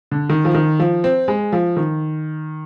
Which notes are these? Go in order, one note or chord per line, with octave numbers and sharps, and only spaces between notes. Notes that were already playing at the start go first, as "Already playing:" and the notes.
D3
D#3
F3
D#3
F3
C4
G#3
F3
D#3